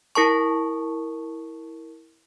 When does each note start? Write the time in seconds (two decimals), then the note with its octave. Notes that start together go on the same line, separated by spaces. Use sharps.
0.15 E4 A#4 A5 C#6